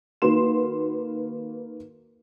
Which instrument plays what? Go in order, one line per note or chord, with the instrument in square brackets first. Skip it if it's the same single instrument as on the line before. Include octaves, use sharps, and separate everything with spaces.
[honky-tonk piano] D#3 A#3 F#4 B4 C6 E7